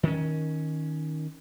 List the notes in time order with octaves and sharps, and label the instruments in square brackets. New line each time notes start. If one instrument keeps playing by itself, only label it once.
[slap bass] D#3 C#4